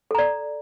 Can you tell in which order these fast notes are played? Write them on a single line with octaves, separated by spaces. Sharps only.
A4 A#5 D5